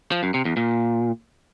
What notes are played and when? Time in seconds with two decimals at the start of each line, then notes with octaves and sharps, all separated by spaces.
0.12 F3
0.23 F#2
0.34 C3
0.45 E2
0.57 A#2